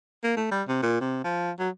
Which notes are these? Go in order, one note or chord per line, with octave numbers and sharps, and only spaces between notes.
A#3
A3
G3
C3
A#2
C3
F3
F#3